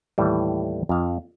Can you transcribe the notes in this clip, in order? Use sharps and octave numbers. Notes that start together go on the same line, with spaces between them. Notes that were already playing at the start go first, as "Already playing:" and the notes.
D#2 A2 E3 G3
F2 F5